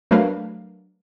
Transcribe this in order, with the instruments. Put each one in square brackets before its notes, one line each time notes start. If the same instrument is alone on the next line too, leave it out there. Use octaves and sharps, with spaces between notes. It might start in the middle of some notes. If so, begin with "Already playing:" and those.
[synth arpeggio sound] F#3 A3 D4 A#4 B4 F5